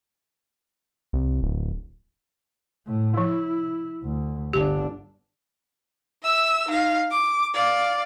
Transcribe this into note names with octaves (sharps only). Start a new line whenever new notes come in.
C2
D1
A2
F3 E4
D2
G1 D4 G4
E5 E6
D#4 F5
D6
D5 F5